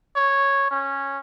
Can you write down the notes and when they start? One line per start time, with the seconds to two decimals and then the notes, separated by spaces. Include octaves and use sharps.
0.16 C#5
0.71 C#4